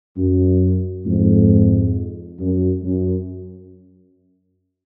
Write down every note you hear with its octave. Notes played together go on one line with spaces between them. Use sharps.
F#2
F2 G#2
F#2
F#2